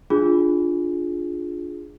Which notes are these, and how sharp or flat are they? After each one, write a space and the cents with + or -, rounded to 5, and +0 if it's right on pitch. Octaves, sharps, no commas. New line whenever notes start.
D4 +5 F4 +0 G#4 +0